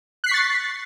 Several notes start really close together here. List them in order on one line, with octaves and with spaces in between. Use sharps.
F#6 C7 B6 C#6 A6